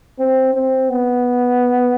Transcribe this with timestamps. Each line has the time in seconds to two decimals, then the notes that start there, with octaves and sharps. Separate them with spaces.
0.19 C4
0.53 C4
0.89 B3